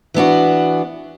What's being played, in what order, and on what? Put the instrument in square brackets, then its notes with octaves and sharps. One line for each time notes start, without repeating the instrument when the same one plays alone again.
[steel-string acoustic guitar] E3 B3 D4 F#4